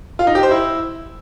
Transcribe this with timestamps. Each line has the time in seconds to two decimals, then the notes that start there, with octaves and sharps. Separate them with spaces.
0.19 F4
0.27 D#4
0.35 G4
0.43 C5
0.51 E4